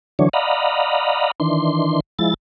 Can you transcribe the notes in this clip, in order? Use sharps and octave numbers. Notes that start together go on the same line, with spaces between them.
D3 E3 F#3 D4 C#5
D5 D#5 F5 F#5 A#5 B5
D#3 E3 D4 C6
F3 G#3 E4 A6